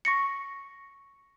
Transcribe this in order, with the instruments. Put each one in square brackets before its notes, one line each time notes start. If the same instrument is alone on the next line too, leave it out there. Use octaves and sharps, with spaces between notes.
[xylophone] C#6 A#6 C#7